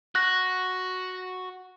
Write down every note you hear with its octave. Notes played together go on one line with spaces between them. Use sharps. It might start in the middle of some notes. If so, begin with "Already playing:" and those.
F#4 F#6 A#6